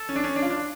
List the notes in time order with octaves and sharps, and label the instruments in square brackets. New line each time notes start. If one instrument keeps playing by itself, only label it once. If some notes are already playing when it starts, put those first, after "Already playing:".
Already playing: [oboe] A4
[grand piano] C#4
D4
C#4
D4
F4
D4